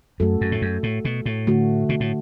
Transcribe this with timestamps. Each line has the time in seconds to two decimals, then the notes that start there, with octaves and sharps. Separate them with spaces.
0.20 F#2 A3 F#4 A4
0.41 F#2
0.52 A2
0.62 F#2
0.83 A2
1.05 B2
1.26 A2
1.47 D3 A3 F#4
1.89 B2
2.00 A2